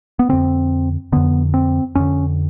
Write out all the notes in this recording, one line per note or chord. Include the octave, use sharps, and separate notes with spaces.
B3
F2 D3 C4
F2 D3 B3
C4
F2 D3 C#4